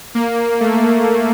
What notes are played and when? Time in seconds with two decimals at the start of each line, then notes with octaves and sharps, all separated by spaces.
0.15 A#3
0.61 A3